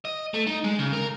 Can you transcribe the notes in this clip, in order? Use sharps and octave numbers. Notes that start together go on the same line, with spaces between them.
D#5
A3
D#4
G#3
C#3
A#4